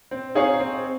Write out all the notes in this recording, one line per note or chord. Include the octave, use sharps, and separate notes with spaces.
C4
D#4 G#4 C#5 F5
C4